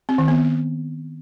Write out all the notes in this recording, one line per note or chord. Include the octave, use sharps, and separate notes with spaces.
C4
D#3
B3